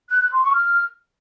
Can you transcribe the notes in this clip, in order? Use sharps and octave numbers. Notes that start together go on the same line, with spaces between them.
F#6
F#6
C6
C#6
F6